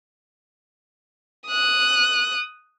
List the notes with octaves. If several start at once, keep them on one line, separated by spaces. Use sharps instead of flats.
D#6 F#6